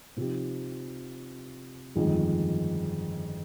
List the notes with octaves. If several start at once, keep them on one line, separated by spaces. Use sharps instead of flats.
C3 F3 C4 D#4 G4
G1 F2 D#3 G#3